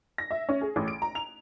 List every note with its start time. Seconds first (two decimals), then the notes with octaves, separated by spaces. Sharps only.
0.18 A#6
0.31 E5
0.49 C#4
0.61 G#4
0.76 A1
0.88 D7
1.02 A#5
1.15 F7